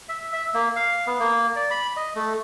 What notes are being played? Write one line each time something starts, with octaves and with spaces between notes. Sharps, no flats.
E5
E5
A#3
F5
B3
A#3
D5
B5
D#5
A3